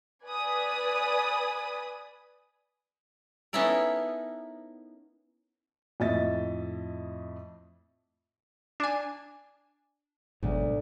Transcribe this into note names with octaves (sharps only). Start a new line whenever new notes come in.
B4 D5 G#5 B5 D#6
B3 C#4 D#4 E4 A4 A#4
F2 A2 D#5 E5 A6
D4 G#5
G1 D2 G#2 B2 F#3